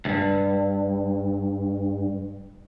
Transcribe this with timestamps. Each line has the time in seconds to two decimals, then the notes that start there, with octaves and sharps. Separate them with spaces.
0.05 C#2 G2